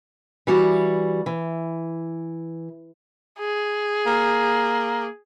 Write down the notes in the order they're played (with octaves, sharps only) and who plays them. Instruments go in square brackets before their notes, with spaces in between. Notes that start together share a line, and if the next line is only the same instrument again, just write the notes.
[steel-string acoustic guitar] E3 G3 F#4
E3
[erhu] G#4
[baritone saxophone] A#3